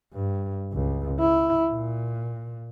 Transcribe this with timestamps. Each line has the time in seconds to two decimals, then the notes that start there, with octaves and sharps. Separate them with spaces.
0.14 G2
0.73 C#2
1.20 E4
1.70 A#2